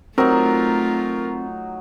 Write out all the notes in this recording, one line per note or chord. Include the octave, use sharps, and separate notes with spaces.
F#3 A3 C4 D#4 F4 A#4